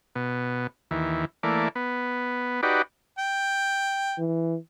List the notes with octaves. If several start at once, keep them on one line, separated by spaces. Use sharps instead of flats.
B2
D#2 E3
E3 A3 A#3 D5
B3
D#4 F#4 G4 B4 D5
G5
E3